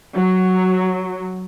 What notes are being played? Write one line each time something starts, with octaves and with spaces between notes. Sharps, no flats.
F#3